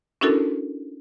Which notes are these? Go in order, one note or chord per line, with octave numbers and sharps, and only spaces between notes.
C#4 D4 E4 F#4 A4 A#4